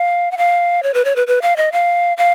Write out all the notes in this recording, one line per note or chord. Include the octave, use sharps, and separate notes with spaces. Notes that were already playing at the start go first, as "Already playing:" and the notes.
Already playing: F5
F#5
F5
C#5
B4
C#5
B4
B4
F5
D#5
F5
F5